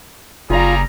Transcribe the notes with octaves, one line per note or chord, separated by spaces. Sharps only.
F#1 G3 F4 G#4 D5 F5 A#5